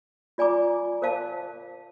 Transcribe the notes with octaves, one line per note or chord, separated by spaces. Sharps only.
F4 D5 G#5 A#5 D6
A#4 C5 F5 A5